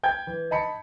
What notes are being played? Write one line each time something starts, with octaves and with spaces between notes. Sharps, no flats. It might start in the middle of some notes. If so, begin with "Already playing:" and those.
G5 G6 G#6
E3
D#5 A5 B5 C#7